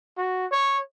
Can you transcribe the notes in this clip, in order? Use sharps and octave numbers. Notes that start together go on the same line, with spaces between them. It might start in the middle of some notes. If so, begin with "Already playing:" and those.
F#4
C#5